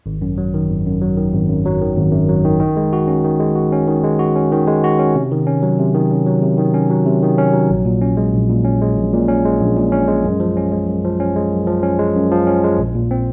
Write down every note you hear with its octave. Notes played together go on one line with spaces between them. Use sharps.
G#1
F#2
F#3
D#3
G#1
F#2
F#3
D#3
G#1
F#2
F#3
D#3
G#1
F#2
F#3
D#3
D#3
G#3
F#4
C#4
D#3
G#3
F#4
C#4
D#3
G#3
F#4
C#4
D#3
G#3
F#4
C#4
C3
D#3
C#4
F#3
C3
D#3
C#4
F#3
C3
D#3
C#4
F#3
C3
D#3
C#4
F#3
A#1
A#2
C#4
G#3
A#1
A#2
C#4
G#3
A#1
A#2
C#4
G#3
A#1
A#2
C#4
G#3
F#2
F3
C#4
G#3
F#2
F3
C#4
G#3
F#2
F3
C#4
G#3
F#2
F3
C#4
G#3
A#1
A#2
C4